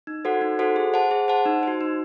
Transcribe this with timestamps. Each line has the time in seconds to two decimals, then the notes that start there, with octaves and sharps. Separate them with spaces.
0.07 D#4
0.25 F#4 A4 C5 F#5
0.41 D#4
0.59 F#4 A4 C5 F#5
0.76 G#4
0.94 C5 F#5 A5
1.11 G#4
1.28 C5 F#5 A5
1.46 D#4
1.63 F#4 C5
1.81 D#4